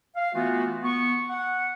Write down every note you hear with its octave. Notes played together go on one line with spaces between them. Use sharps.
F5
E3 A3 B3 F4 F#4
B3 C#6
F#5